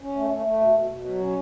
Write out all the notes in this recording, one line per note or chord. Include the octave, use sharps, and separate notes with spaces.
C#4
A3
A3
A3
B2
B2
B2
F#3
C#4